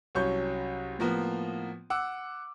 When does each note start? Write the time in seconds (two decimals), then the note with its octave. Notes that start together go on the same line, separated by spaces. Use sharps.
0.15 C2 F#3 C#4 C#6 G6
0.99 A2 F3 A#3 B3
1.90 F#5 D6 E6